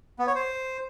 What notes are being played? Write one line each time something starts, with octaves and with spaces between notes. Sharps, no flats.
B3
C#5
C5